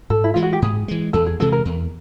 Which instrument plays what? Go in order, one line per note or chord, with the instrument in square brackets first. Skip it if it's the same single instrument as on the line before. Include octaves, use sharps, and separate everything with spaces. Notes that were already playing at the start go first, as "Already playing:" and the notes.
[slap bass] G#2 [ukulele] A4
[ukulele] E4
[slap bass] E3 G#3 [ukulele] F4
[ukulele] F#4
G4
[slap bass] G#2 [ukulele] G#4
[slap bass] E3 G#3
[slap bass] E2 [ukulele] A4
[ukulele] G#4
[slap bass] C3 E3 G#3 [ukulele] A4
[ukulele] A#4
[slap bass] E2